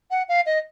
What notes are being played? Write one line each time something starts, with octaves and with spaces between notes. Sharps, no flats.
F#5
F5
D#5